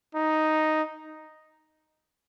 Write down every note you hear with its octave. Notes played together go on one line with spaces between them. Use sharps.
D#4